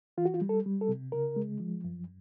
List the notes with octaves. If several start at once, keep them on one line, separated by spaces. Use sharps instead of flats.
E3 F4
F#4
F4
G3
A4
G3
A4
C3
C#3 A#4
G#3
F3
F#2